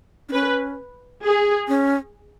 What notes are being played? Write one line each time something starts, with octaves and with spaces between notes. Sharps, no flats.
D4
C#4 B4
G#4
C#4